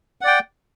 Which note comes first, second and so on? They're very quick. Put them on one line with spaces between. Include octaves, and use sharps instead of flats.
F#5 D5 G5